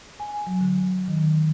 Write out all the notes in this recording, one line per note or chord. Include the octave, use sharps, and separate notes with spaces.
G#5
F#3
D3
D#3